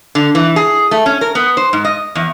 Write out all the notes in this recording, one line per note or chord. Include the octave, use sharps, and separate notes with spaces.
D3
E3
G#4
A3
C#4
A#4
B3
C5
G#2
D#5
E2